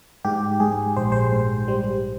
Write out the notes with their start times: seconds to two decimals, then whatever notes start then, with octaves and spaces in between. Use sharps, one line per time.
0.25 G#2 G4
0.60 G#2 G#4
0.96 A#1 C5
1.12 C5
1.33 G#2
1.68 G3